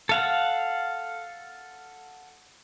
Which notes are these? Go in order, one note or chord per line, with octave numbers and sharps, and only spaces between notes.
A4 F5 F#5